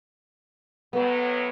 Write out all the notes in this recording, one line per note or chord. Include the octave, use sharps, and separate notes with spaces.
A2 F#3 B3